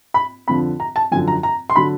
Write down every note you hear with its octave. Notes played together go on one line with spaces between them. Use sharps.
B5
F2 D3 F3 B5
A#5
A5
F#2 D3 F3 G#5
A#5
A#5
C6
D3 F#3 B5